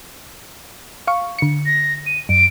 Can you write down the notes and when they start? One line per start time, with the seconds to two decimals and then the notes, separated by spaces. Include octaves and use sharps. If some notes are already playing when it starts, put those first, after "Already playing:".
1.07 F5 C#6
1.39 D3 C#7
1.66 A#6
2.06 D#7
2.29 F#2 D7